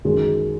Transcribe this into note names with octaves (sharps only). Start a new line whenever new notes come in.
F#2 D#3 G#3